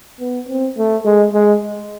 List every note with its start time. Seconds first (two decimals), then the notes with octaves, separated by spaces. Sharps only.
0.20 B3
0.48 C4
0.77 A3
1.05 G#3
1.33 G#3